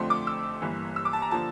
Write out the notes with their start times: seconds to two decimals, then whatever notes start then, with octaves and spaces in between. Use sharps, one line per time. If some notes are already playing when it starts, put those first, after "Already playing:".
Already playing: F2 D3 F3 A3 C4 C6
0.10 D6
0.27 E6
0.61 G1 G2 E3 A#3
0.96 E6
1.05 D6
1.13 A5
1.22 A#5
1.31 D3 F3 A#3 A5